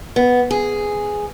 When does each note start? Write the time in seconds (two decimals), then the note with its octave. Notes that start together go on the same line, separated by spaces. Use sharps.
0.16 B3
0.51 G#4